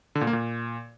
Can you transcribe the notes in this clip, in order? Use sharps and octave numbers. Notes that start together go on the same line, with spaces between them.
D3
A#2
A#3
A#2